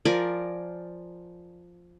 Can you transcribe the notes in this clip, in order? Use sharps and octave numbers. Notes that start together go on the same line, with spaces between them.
F3 A#4 D5 G#5